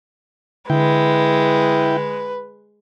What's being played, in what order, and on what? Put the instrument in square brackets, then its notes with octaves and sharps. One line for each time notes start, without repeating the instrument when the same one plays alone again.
[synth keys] D3 [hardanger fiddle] G#3 [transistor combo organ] E4 G5 [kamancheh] B4